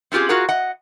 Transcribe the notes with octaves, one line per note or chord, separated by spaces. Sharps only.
C4 C#4 F4 G4 G#4
F4 F#4 G#4 A#4 F#5
D#5 F#5